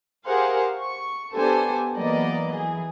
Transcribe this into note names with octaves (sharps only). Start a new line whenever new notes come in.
G4 G#4 A#4 C5 F5 F#5
C#6
B3 D4 G4 A4 C5 G#5
E3 F#3 A#3 B3 D5 D#5
E3 G#4